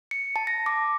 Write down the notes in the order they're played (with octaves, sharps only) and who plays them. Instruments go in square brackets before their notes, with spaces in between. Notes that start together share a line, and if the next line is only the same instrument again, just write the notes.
[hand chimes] C#7
A5
A#6
D6